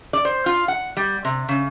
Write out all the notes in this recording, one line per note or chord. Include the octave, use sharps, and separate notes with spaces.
D5
C5
F4
F#5
G3
C3
C#3